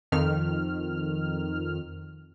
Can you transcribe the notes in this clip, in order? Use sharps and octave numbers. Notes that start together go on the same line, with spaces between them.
F2 D#3 F6